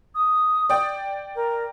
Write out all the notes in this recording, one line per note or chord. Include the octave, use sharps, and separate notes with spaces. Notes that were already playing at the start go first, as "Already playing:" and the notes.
D#6
D5 G5
A#4